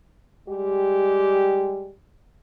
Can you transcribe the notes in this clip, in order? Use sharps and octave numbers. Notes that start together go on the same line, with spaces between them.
G3 G#3 G4